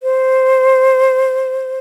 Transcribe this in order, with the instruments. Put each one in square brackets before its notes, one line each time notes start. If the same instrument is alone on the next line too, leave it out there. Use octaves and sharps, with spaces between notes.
[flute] C5